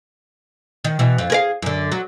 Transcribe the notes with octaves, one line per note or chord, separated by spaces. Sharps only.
D#3
B2 E3
F2
G#4 A#4 F5
F#2 D3
F#3